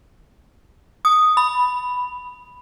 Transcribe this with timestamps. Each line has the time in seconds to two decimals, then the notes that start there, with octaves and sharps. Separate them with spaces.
1.05 D#6
1.37 B5